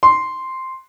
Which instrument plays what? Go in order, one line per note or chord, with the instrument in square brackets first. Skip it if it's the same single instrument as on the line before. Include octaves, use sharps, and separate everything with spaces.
[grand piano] C6